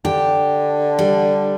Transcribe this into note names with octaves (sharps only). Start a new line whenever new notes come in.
D3 G4
G3